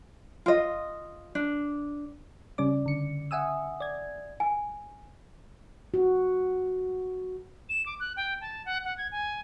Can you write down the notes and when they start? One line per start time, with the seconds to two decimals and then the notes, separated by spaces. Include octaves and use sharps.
0.46 F4 D#5
1.35 D4
2.58 C#3 G3 C#4 D5 D6
2.86 D3 C#7
3.31 E5 F#5 G#5 D#6 E6
3.80 D5 G#6
4.40 G#5
5.94 F#4
7.69 E7
7.86 D6
8.00 F#6
8.17 G5
8.41 A5
8.66 F#5
8.85 F#5
8.98 G#6
9.12 G#5